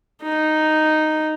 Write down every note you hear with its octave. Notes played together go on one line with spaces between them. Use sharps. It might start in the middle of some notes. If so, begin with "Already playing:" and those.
D#4